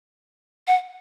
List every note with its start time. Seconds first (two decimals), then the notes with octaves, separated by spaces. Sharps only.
0.68 F#5